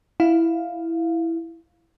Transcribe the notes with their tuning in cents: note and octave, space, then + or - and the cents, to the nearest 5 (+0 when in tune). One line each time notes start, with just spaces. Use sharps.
E4 +0 F5 +5